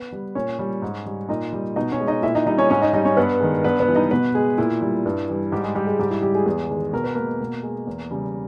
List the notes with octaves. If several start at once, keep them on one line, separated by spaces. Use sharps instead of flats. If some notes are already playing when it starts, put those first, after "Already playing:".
Already playing: B3 B4
G3
A#2 C#4 C#5
G3
G#2
G3
A#2 D#4 D#5
G3
B2 D#4 D#5
C#4 C#5
G#3
D#4 D#5
A#2 E4 E5
D#4 D#5
G3 D#4 D#5
C#4 C#5
G#2 C#4 C#5
D#4 D#5
G3 D#4 D#5
C#4 C#5
G2 B3 B4
D#3 G#3
G2 B3 B4
B3 B4
E3 G3
D#4 D#5
B2 B3 B4
G#3 G#4
A#2 E4
G3
G2
E3 G3
G#2 G3 G4
G#3 G#4
G3 G4
G#3 G#4
G#2 G3 G4
E4
G3 G4
G#3 G#4
E2
D#3 G#3
B2 A#4
B4
G#3 A#3 A#4
B2
G#3
E2
C#3 G3